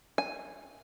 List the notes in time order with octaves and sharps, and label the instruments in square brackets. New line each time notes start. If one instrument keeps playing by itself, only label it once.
[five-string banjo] G#5